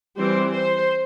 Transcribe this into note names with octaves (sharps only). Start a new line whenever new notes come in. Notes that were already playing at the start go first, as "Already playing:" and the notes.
E3 G3 C4 C5
C5